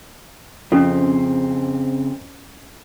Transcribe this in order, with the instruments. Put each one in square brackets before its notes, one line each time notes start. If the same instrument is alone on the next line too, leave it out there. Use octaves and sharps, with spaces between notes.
[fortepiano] F2 [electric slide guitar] C#3 C4 [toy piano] C#4 A4